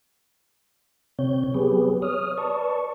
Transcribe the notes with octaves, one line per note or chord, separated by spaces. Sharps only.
C3 C4 C#5 G6
F#3 B3 G4 G#4 B4
C#5 D#6 F6
B4 D5 A5 C#6